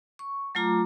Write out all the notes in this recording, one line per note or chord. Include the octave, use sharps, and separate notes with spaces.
C#6
F#3 A3 F4 A#5 D6